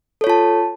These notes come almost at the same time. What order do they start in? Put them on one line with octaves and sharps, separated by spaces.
A4 C#5 F4 A5